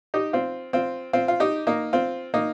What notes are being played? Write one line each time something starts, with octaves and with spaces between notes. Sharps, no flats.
D#4 G4
C4 F4
C4 F4
C4 F4
F4
D#4 G4
A#3 D#4
C4 F4
A#3 D#4